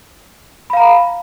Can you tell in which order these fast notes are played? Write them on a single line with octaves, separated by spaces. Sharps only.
B5 F5 A#5